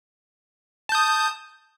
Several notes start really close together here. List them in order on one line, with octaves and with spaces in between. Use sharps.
A5 G6 D#6